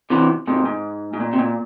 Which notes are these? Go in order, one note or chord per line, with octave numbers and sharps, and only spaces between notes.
C3 E3
G#2 C3
G#2
G#2
A#2
C3
A#2